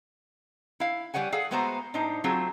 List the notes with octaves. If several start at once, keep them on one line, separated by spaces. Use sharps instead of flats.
E4 F5
G3 B4 C#5 F#5 G#5
G#4 A4 F5 F#5
G#3 A3 B3 F#4 C5 A#5
A2 D4 D#4 C5 A#5
F#3 A3 C4 F4 G#4